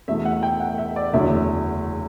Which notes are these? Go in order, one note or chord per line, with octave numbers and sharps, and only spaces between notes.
E1 E2 B2 A3 E5
F#5
G5
F#5
E5
D5
F#1 E2 D3 F#3 A3 E5